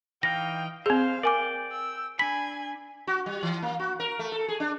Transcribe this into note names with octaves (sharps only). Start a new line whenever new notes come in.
E3 D#4 F5 G5 A#6
C4 G#4 C5 F5
A#4 D5 G5 G#5 D6
E6
D4 G#5 B5 B6
F#4
G3
E3
A#3
F#4
A#4
A3
A4
G#4
D4